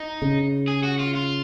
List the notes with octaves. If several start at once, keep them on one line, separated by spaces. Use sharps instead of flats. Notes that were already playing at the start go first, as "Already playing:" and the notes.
Already playing: D#4
C#3
G#4
F#4
F4
F4